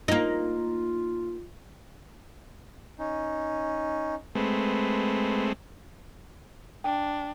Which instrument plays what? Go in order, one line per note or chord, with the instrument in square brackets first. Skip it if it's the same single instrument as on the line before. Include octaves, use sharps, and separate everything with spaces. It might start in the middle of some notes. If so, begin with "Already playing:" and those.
[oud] A#3 D#4 [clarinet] F4
[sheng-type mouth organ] C#4 D#4
[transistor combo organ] G#3 A3 C4 [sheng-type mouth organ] B4
[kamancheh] D4 [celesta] G5